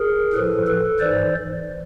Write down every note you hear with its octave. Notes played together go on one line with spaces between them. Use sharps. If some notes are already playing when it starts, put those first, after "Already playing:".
Already playing: G#4 A#4
A2 F3 A4 B4
A4 B4
G#2 E3 C5 D5